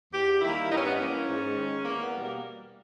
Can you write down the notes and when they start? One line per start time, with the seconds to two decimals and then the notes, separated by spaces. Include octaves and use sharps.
0.13 E2 G4
0.41 D#3 G3 A#3 E4
0.71 G2 D#4
0.78 C#4
0.85 B3
0.94 C#4
0.99 E3 A#3
1.27 G#2
1.56 D#3 G#3
1.84 E2 A#3
2.04 B3
2.13 B2 G3 A#3
2.23 A#3